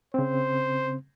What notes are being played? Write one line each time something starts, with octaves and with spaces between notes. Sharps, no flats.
C#3 C4 C5